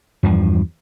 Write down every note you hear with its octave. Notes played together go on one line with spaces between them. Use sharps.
E2 G2 F3